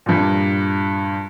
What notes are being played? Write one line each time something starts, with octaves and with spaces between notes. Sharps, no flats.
G2 A#2